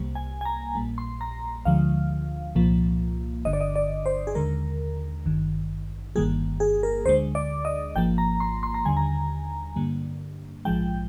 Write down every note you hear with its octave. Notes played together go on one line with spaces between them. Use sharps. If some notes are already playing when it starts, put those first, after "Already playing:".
Already playing: C2 C3 G3 A#3
G#5
G#5
A#5
A#1 A#2 G3 A#3
C6
A#5
D2 D3 F3 G#3 F5
C2 A#2 F3 A#3
G1 G2 D3 D#5
D5
D#5
D5
C5
G#4
D#2 D3 G#3 A#4
G#1 G2 D#3
G1 G2 D#3 G3 A#3 G#4
G#4
A#4
D2 D3 G#3 C5
D5
D#5
G#1 G#2 F3 A#3 G5
A#5
C6
C6
A#5
D#2 D3 G3 G#5
A#5
G2 D3 G3 A#3
A#1 G#2 F3 G#3 G5